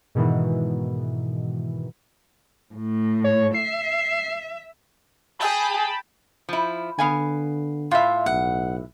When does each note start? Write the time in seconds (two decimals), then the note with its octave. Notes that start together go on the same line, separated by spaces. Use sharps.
0.15 G#2 B2 D#3 E3
2.74 A2
3.24 C#5
3.54 E5 C7
5.39 G#4 G5 A5 B5
6.49 F3 E4
6.99 D3 B3 F5 G#5
7.91 A2 F4 E5
8.26 B1 F#5